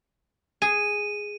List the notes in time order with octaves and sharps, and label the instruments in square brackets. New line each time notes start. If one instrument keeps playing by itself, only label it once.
[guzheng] G#4 [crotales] D#7